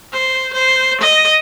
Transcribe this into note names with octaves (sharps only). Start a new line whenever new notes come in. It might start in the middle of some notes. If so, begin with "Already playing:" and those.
C5
C5
D#5